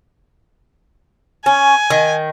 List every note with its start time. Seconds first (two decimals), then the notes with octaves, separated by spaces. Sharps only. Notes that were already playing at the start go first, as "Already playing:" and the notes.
1.46 C#4 G#5
1.90 D#3